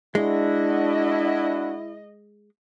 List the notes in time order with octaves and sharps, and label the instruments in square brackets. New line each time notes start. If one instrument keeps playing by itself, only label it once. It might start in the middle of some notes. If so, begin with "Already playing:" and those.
[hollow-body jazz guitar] G#3 [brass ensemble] D4 F#4 [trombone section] E4 [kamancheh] D#5